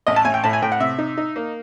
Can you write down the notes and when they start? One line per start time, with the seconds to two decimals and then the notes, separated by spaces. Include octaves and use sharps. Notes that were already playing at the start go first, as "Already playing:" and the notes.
0.07 A1 D#5
0.16 A5
0.25 A1 G#5
0.34 G5
0.44 A2 A5
0.53 G#5
0.62 A2 G5
0.72 F#5
0.80 C3 E5
0.98 D#4
1.17 D#4
1.36 A#3